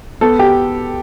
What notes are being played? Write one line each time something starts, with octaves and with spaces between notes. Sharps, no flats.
B3 A4
G4